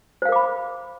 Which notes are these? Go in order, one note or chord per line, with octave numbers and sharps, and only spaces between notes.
A#4 C5 F5 B5 D6